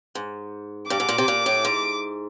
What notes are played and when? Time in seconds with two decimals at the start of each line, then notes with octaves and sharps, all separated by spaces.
0.15 G#2
0.90 G2 D6
1.00 G#2
1.09 A#2
1.18 C3
1.28 A#2
1.46 A2
1.65 G#2